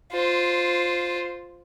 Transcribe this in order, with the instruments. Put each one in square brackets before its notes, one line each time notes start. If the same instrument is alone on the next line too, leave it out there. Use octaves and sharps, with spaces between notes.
[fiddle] F4 C5